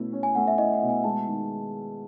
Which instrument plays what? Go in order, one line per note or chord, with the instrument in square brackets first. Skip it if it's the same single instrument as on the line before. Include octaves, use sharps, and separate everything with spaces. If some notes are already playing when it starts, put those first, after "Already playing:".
Already playing: [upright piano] B2 A3 C#4 E4
C#4
[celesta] G#5
[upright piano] A3 [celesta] F#5
[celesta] E5
[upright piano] E4 [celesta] D#5
[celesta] F#5
[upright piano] B2
[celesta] G#5
[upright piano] G#3 [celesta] A5
[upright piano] D#3